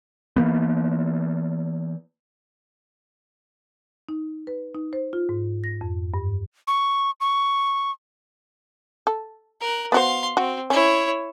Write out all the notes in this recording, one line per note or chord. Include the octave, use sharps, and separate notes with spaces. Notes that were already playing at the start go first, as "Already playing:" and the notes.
E3 A#3 B3
D#4
B4
D#4
C5
F4
G#2
A#6
F2
G2
C#6
C#6
A4
A#4 F#6
B3 F#4 C5 F5 C6
C4 F#4
C#4 E4 C#5